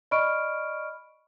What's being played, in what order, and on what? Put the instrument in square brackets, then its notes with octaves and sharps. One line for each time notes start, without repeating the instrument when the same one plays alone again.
[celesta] D5 D#5 B5 C#6 F6 D7